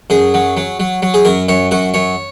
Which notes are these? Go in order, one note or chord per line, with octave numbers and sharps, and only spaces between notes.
F#2 G#4
F#3
F#3
F#3
F#3
G#4
F#2 A#4
F#2 C#5
F#2 F#4
F#2 C#5